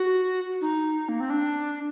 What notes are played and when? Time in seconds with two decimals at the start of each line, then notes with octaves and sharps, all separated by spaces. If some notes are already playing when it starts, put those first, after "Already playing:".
Already playing: F#4
0.61 D#4
1.09 A#3
1.20 C4
1.30 D4